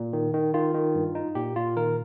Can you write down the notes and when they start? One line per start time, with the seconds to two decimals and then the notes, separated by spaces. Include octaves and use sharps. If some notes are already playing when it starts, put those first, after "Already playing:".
Already playing: A#2
0.13 D#3
0.34 D#3
0.54 D#3 F4
0.74 D#3
0.95 G2
1.15 D#4
1.35 A#2 G4
1.56 A#2 F4
1.76 D#3 A#4